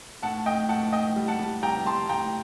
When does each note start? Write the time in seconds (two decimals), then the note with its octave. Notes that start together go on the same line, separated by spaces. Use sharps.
0.22 A2 F#5 A5
0.46 A2 D#5 G5
0.69 A2 F#5 A5
0.92 A2 D#5 G5
1.16 G3
1.28 F#5 A5
1.39 G3
1.63 G3 G5 A#5
1.86 G3 A5 C6
2.09 A2 G5 A#5